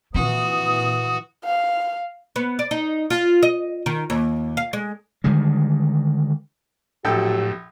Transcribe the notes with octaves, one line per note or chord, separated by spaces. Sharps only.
A#2 E3 C4 F#4 D#6
F5
B3
D5
D#4
F4
D#5
D#3
D#2
F5
G#3
D3 D#3 G3 G#3
A#1 A2 F#3 F#4 G4 A4 G5